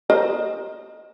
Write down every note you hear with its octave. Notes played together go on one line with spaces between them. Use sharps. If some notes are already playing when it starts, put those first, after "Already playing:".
A#4 C5 D#5